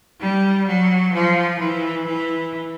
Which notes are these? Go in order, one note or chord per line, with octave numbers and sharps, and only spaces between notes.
G3
F#3
F3
E3
E3